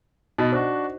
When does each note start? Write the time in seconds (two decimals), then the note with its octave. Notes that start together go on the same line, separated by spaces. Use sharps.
0.38 B2 D#4 F#4 D#5
0.53 D4 F#4 C5